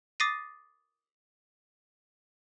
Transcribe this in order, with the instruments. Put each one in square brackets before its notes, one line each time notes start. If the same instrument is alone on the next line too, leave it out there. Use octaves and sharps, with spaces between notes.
[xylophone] D6 D#6 A6 A#6 C7 D#7